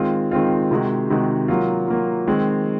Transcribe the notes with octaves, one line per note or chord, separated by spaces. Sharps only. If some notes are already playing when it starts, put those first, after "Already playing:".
Already playing: D#3 G#3 C4 F4
D#3 G#3 C4 F4
C3 D#3 G#3 D#4 F#4
C3 D#3 G#3 D#4 F#4
F#3 A#3 F4
F#3 A#3 F4
D#3 G#3 C4